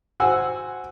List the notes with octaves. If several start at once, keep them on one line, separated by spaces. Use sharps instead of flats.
F#4 C5 F#5 G#5 E6